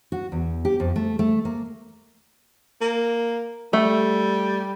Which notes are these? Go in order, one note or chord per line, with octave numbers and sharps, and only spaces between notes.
F#4
E2
G4
F2
A3
A3
A#3
A#3
G3 A3